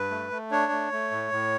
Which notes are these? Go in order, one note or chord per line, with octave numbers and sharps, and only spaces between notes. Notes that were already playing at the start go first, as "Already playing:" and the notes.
Already playing: G2 B4
A3
A3
D4 C#5
A3
A3
A2
A2